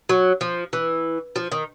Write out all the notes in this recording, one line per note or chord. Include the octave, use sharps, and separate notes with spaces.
F#3
F3
E3
F3
D#3